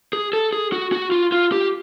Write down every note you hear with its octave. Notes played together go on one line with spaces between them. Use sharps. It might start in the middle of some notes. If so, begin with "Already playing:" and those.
G#4
A4
G#4
F#4
F#4
F4
F4
G4